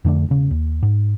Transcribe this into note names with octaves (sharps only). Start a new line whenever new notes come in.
F2 D3 A3 D4
E1 C#3
D#2
G#2